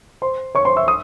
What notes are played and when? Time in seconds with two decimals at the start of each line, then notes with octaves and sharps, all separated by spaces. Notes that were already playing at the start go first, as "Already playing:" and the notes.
0.22 C5 C6
0.55 C#5 C#6
0.65 C5 C6
0.76 E5 E6
0.88 D#6